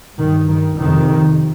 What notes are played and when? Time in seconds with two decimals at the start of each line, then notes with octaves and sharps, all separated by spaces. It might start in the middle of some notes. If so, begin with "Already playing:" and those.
0.19 G2 D#3
0.49 D#3
0.79 F2 C3 D#3